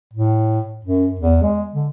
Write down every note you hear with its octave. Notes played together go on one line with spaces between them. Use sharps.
A2
F#2
E2
G#3
D3